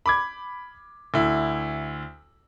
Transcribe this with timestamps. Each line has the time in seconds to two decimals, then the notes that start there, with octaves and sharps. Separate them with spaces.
0.06 B5 D6 G#6
1.14 D2 E4